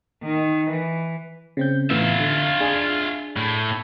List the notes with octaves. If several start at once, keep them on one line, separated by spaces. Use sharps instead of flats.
D#3
E3
C#3 C4 G6
A2 E3 B3 F4 E5
D3
D4 G#4
A2